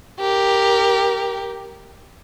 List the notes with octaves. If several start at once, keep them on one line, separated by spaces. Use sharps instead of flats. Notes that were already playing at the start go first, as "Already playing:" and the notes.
G4 A#4